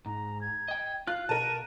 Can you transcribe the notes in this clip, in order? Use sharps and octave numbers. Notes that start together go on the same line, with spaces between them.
G#2 A#5
G#6
D#5 G5
F4 F5 F#6
B2 A#4 A5 D#7